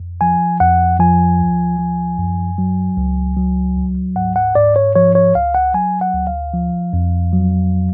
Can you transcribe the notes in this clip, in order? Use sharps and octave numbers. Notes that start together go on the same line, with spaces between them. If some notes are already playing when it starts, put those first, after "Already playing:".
Already playing: F2
F3 G#5
F2 F#5
F3 G#5
D2
F3
F#2
F#3
C#2
F#3
D2
G#2 F#5
F#5
G#2 D5
C#5
F3 C#5
C#5
C#2 F5
F#5
F#3 G#5
F#5
D2
F5
F3
F2
F#3